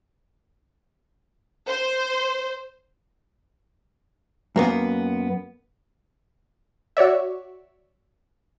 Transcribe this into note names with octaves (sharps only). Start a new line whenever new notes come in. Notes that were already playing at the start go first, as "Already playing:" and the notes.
C5
F#2 A#3 B3
F#4 C#5 D5 E5